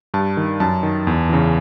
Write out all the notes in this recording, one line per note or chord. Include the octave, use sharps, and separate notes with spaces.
G2 A5
D#3
F#2 A5
D#3
E2
C#3 E3